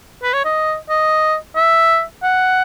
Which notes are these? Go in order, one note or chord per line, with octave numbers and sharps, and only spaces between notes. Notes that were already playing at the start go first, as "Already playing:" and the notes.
B4
C#5
D#5
D#5
E5
F#5